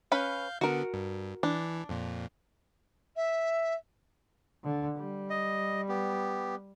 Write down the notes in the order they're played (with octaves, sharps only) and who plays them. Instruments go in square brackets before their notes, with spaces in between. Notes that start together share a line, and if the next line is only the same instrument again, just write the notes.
[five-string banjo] C#4 B4 B5 [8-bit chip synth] F5 G6
[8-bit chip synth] D3 B3 [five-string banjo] F#4 A#4
[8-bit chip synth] G2
[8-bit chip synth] E3 [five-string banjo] D4
[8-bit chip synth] F2 A#2
[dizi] E5
[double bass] D3
G3
[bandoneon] D#5
B3 G4